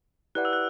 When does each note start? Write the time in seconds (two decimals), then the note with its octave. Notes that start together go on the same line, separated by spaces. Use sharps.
0.35 E4 G4 B4 D5 F#5 F#6
0.45 E6
0.53 F#6